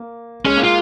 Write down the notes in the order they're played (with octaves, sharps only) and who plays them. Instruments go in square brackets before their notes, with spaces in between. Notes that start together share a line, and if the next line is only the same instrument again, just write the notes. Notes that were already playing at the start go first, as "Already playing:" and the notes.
Already playing: [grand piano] A#3
[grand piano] G#3 [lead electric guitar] C#4
[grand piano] A#3
[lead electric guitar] F4